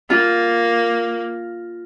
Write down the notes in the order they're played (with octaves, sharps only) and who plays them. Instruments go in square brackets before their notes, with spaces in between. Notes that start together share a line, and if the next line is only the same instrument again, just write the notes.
[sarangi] A#3 [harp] F4